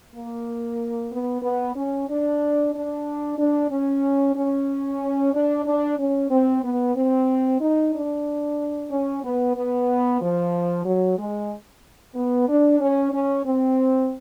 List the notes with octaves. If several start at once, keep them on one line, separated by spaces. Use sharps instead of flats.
A#3
B3
B3
C#4
D4
D4
D4
C#4
C#4
D4
D4
C#4
C4
B3
C4
D#4
D4
C#4
B3
B3
F3
F#3
G#3
B3
D4
C#4
C#4
C4